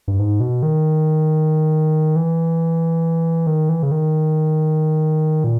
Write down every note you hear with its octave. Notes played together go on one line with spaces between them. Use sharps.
G2
G#2
B2
D#3
E3
D#3
E3
C#3
D#3
A#2